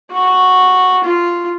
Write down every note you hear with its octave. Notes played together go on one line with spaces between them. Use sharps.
F#4
F4